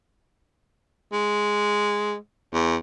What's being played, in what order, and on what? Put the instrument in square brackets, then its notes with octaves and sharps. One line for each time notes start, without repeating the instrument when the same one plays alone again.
[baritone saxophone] G#3
E2